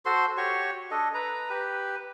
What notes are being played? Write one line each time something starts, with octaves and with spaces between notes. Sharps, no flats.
F#4 A4 C5 C6
F#4 G4 C#5 C#6
D4 A4 D#5
B4 A#5
G4 B4